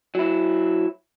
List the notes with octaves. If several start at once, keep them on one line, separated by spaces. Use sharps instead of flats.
F#3 E4